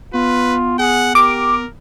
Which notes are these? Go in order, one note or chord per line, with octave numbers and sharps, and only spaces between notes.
B3 F4 B4
G#4 F#5
G4 A#4 D6